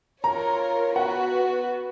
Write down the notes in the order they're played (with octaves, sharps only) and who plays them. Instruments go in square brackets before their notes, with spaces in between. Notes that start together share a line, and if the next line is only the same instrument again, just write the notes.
[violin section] F4 A#4 C#5 [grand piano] A#5
[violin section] B3 F#4 B4 [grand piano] F#5